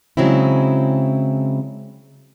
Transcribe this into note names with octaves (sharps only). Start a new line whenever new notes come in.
C#3 F#3 G#3 C4 E4